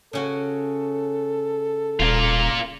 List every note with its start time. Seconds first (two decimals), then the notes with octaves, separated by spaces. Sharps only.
0.13 C#3 C#4 F#4 A4
2.00 D#1 A#3 F4